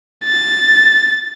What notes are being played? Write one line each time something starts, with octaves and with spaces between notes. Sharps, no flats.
A6